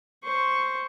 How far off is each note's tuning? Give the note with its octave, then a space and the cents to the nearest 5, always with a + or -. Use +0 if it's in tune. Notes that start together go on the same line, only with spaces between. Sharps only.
C5 +0 C#6 +0